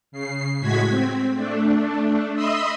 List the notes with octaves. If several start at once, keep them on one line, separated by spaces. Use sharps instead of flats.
C#3 C7
A2 G#3 F#4 G#6 B6
C4
A3 D4
D#5 E5 B5 C6 D#6 E6